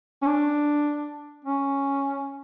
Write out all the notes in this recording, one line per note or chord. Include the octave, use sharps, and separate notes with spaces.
C#4
D4
C#4